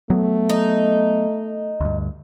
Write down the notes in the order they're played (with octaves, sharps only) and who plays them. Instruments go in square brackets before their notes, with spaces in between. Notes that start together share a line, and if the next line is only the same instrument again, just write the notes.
[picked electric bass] F#3 B3 [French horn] A3
[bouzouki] D#4
[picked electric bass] D2 G2